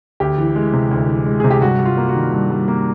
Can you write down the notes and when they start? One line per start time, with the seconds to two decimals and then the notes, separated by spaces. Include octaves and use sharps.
0.20 D2 G4
0.38 E3
0.56 G#3
0.73 C3
0.91 D2
1.09 E3
1.26 G#3
1.40 C3 G#4
1.51 G4
1.62 G2 F#4
1.79 G3
1.86 F4
1.97 A#3
2.09 F#4
2.15 D#3
2.32 G2
2.50 G3
2.68 A#3